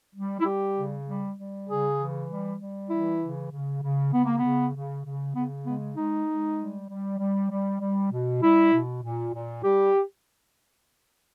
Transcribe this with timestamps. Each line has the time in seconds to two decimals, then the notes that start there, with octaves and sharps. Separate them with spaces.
0.15 G3
0.40 E4
0.45 G3 G4
0.76 C#3
1.07 G3
1.37 G3
1.68 C#3 G#4
1.98 E3
2.29 G3
2.59 G3
2.89 E3 E4
3.21 C#3
3.51 C#3
3.82 C#3
4.13 C#3 B3
4.25 A#3
4.39 C#3 B3
4.74 C#3
5.05 C#3
5.35 C#3 B3
5.65 G#3 B3
5.96 G#3 D#4
6.27 G#3
6.57 G3
6.88 G3
7.18 G3
7.50 G3
7.80 G3
8.11 B2
8.41 G3 E4
8.72 B2
9.02 A#2
9.33 A#2
9.64 G3 G4